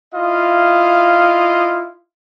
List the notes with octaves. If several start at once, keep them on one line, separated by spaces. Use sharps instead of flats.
E4 F4 D#5 F5